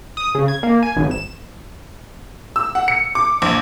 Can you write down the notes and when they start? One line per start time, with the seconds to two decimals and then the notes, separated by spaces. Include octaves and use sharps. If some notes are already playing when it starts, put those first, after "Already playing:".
0.17 D#6
0.35 C#3
0.48 G#6
0.63 A#3
0.82 G#5
0.96 G#1
1.11 E7
2.56 E6
2.75 F#5
2.88 C#7
3.15 D6
3.42 A#1